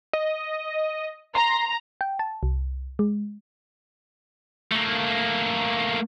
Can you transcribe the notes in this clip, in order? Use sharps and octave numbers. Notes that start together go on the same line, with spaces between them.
D#5
A#5 C6
G5
A5
C2
G#3
A3 A#3